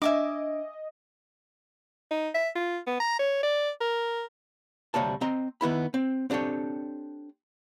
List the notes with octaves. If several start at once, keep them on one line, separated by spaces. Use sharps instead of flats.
D4 D#5 E5 G#5 D6
D#4
E5
F4
B3
A#5
C#5
D5
A#4
D2 C3 G3 A#3 C#5 A5
C4 D#5 A#5 C6
D#3 B3 E4 B5
C4
C4 D4 G4 A4 C#5